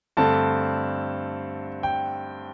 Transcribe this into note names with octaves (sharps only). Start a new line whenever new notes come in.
G2 D3 A3 C4 A5
G5